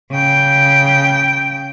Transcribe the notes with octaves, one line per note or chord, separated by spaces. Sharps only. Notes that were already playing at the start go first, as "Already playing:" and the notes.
C#3 G5